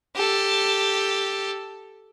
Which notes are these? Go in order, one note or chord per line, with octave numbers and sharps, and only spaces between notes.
G4 A4